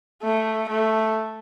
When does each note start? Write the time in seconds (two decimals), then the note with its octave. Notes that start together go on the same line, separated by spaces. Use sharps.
0.22 A3
0.69 A3